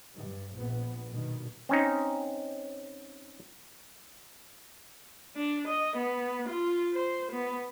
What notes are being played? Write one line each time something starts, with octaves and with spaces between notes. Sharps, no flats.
G2
A#1 B3
G2 B2 D#3
C4 C#4 D#4
D4
D#5
B3
F4
C5
B3